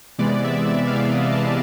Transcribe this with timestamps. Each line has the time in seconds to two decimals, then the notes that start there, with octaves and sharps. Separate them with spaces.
0.19 C3 E3 G#3 B3 D5
0.44 E5
0.69 E5
0.87 F5
0.94 C3 E3 G#3 B3 E5
1.13 D#5
1.32 A5